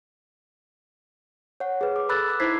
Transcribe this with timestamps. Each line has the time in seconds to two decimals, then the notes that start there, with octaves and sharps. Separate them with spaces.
1.60 C#5 F#5
1.81 G#4 B4
1.96 D6
2.09 A4 B4 B5 E6 F#6 A6
2.28 B5 D6 E6
2.40 D#4 E4 C5 G#6 B6 C7